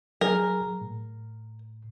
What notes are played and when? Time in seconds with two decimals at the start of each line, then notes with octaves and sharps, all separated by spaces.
0.21 F#3 G#4 A#4
0.81 A2